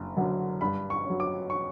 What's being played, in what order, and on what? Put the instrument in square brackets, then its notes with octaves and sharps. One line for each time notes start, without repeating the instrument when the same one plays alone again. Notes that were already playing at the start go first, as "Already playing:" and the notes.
Already playing: [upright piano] F#1
F#2 D3 F#3
G2 B5
C#6
F#3 C#4
D6
C#6